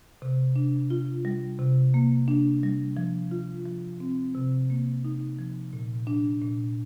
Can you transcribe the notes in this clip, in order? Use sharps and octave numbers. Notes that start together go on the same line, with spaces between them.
C3
D4
F4
G3
C3
A#3
D4
G3
F3
F4
F3
C4
C3
A#3
D#4
F3
A#2
D4
A#2